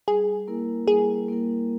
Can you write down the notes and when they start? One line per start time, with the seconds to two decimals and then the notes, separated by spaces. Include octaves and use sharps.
0.08 G3 G#4
0.48 A#3 E4 A#4
0.88 G3 G#4
1.28 A#3 E4 A#4